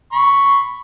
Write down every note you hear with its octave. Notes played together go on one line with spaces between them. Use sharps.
B5 C#6